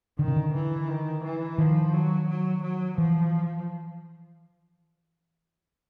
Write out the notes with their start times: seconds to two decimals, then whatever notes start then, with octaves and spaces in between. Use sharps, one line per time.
0.18 D3 D#3
0.28 C#3
0.36 D3
0.53 E3
0.88 D#3
1.24 E3
1.58 D#3 F3
1.93 F#3
2.28 F#3
2.63 F#3
2.98 E3 F3